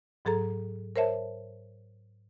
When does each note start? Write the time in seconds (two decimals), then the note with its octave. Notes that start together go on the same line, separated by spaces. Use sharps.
0.25 G#2 F#3 G#4 A4 A#5
0.96 A#4 C5 C#5 E5 A5